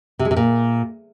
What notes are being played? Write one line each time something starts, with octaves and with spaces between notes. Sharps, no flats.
C3
G#3
C3
A#2